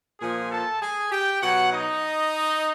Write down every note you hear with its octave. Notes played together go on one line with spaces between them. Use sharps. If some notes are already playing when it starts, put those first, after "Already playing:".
A#2 F3 G#4 G#5
A4 A5
G#4 G#5
G4 G5
B2 F#3 F#4 F#5
D#4 D#5